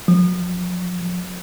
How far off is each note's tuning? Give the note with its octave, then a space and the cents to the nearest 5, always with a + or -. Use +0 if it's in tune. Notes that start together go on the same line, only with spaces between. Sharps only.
F3 +45